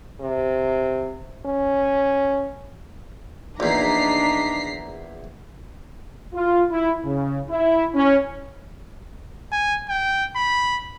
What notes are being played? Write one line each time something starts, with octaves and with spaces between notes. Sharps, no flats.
C3
C#4
A#1 E2 D4 D#4 A#5 B6 C7
F4
E4
C#3
E4
C#4
G#5
G5
B5